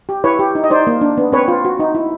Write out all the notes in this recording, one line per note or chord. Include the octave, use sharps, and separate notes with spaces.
G4
E4 B4 C#5
G4
D#4
D#5
D#4 C5 D5
A#3
D4
B3
C4 B4 C#5
F4
F#4
D#4
E4